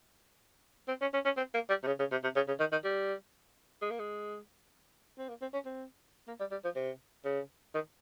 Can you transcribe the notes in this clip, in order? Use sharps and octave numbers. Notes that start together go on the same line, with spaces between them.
C4
C#4
C#4
C#4
C4
A#3
G3
C3
C#3
C#3
C3
C3
C#3
C#3
D#3
D#3
G3
G#3
A#3
G#3
C4
A#3
C4
C#4
C4
A#3
G3
G3
F3
C3
C#3
D#3